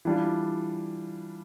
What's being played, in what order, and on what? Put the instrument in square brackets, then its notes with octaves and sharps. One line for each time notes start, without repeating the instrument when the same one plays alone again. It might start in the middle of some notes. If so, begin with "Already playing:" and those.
[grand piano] E3 G3 D4 F4